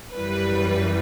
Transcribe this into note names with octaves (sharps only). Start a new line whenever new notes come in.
F#2 E3 G3 B4